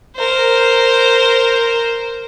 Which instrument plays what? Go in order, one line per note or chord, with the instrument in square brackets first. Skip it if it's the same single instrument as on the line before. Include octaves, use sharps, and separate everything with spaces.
[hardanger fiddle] A#4 C5